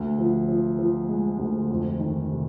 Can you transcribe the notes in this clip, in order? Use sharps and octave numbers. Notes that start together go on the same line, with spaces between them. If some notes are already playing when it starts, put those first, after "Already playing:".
Already playing: D2
F3
F3
F3
G#3
D2
F2
D#3
C3